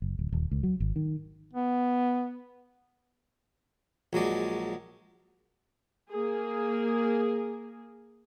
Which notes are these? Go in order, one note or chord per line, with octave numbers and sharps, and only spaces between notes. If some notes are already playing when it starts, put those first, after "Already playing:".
F#1
D1
D#1
C#2
F#3
G#1
D#3
B3
A#1 F#3 G#3 D5
A#3 G#4